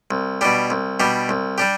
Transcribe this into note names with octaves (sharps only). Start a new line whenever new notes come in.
C2
B2 G3 D4 G4
C2
B2 G3 D4 G4
C2
G3 D4 G4